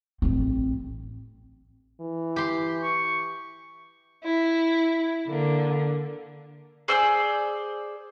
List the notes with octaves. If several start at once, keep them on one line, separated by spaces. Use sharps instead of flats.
A1 C4
E3
G4 C6
C#6
E4
D3 A#3
G#4 C5 D5 E6